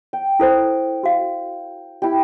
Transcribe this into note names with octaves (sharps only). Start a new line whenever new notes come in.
G5
E4 A4 C5
F#4 F5
E4 G4